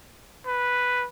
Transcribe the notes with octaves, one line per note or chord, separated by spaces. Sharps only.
B4